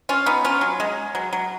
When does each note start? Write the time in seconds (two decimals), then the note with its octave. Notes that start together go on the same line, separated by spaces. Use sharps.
0.09 C#4 F4
0.26 B3 D#4
0.45 C#4 F4
0.61 F#3
0.80 G#3
1.15 F#3
1.33 F#3